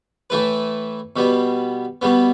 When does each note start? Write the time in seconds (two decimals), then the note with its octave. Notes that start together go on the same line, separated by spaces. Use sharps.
0.30 A2 E3 A3 E4 B4
1.16 B2 G3 B3
2.02 B2 G3 B3